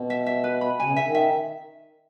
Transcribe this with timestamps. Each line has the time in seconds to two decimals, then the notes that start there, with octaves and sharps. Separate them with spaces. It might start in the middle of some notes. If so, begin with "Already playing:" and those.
Already playing: B2
0.10 E5
0.26 E5
0.44 B4
0.61 B5
0.80 C#3 G#5
0.89 B2
0.96 C#3 E5
1.05 D#3
1.15 E5